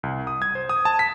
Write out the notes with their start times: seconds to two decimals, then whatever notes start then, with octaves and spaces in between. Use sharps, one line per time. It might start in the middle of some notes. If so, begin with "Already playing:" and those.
0.03 C2
0.27 D#6
0.42 G#6
0.55 C5
0.69 D#6
0.85 A5
0.99 B6